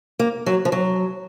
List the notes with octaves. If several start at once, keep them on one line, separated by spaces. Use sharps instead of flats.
A#3
F#3
F3
F#3